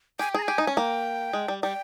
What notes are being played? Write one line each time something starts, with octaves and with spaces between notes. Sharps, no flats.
G4 G#5
G5
G#4 A#5
G#5
G4
D#4
C#4
A#3 G5
G#3
G3
G3 G5